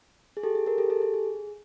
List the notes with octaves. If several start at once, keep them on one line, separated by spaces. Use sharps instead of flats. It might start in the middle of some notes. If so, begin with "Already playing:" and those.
G#4
G4 A4
G#4
G#4 A#4
G4 A4
G4 A4
G#4
G#4